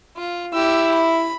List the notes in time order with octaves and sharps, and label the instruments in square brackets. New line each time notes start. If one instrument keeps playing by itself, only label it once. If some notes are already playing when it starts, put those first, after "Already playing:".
[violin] F4
[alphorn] E4 [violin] G4 E6
[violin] B5